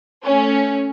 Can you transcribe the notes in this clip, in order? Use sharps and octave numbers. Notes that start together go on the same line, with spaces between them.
A3 C#4